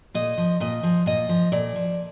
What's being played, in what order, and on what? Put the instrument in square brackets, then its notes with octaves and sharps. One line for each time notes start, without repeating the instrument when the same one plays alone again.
[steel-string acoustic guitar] A#2 D#5
F3
A#2 D#5
F3
A#2 D#5
F3
A#2 D5
F3